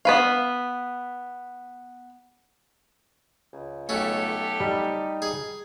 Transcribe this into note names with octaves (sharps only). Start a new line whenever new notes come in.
B3 B4 F5
C#2
B1 A3 C#4 G4 A4
G3 D#4
G#4